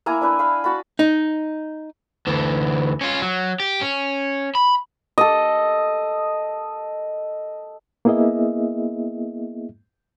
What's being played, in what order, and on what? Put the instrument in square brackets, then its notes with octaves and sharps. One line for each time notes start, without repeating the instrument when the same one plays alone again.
[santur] A#3 E4 G#5 A#5
D4 E4 B4
F5 B5
F#4 A5 B5
[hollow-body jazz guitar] D#4
[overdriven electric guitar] D2 E3
C#4 F4
F#3
G4
C#4
B5
[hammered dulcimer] A4 D#5
[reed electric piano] A#3 B3 E4 G#4 D#5 E5